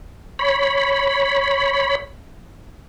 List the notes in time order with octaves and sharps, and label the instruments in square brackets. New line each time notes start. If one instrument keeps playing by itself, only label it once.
[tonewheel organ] C#5 B5